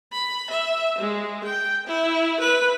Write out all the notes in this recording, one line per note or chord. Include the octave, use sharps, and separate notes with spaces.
B5
E5
G#3
G5
E4
B4